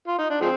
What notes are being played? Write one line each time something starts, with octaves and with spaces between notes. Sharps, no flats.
F4
D#4
D4
F3 G#3 C4